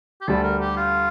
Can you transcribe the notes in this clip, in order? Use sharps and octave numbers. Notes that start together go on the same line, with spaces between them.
G4
D2 D3 G3 D4 A4
A#4
G4
F4